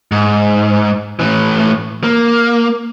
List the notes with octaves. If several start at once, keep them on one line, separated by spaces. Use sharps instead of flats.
G#2
A2 E3
A#3